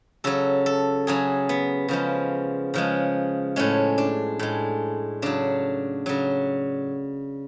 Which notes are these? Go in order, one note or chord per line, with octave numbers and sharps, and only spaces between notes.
C#3 F#3 A4
A4
C#3 F#3 G#4
B3
C#3 F3 G#3
C#3 F3 G#3
A2 G#3 C#4
D4
A2 G#3
C#3 F#3 D4
C#3 F#3